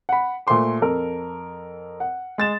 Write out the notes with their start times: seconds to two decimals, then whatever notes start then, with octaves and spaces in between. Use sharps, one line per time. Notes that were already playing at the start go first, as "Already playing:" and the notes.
0.09 F#5 B5
0.47 A#2 A3 C5 C6 D6
0.81 F2 A4 A#4
2.00 F#5
2.38 G#3 A6 E7